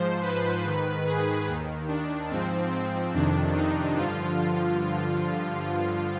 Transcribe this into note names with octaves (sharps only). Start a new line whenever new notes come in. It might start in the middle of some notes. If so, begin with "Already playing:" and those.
Already playing: G#2 F3 C5
B4
G#2 D#3
G#4
D#2 D#3
D4
G#2 F3 C4
C4
F2 C3 D#3 D4
D#4
G2 D3 F3 F4